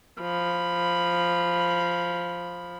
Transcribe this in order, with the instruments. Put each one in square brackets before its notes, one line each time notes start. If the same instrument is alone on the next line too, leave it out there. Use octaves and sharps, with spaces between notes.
[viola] F3 B5